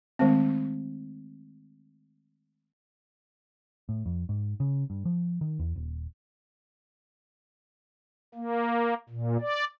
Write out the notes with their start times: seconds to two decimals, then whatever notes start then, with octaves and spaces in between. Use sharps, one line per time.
0.19 D#3 G#3 A3 C4
3.89 A2
4.06 F2
4.29 G#2
4.60 C#3
4.90 G2
5.05 F3
5.41 D#3
5.59 E2
5.76 D#1
8.35 A#3
9.10 A#2
9.41 D5